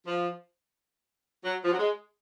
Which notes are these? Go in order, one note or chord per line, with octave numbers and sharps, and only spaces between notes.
F3
F#3
F3
F#3
G#3